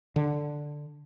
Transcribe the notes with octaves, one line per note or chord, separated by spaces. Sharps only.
D3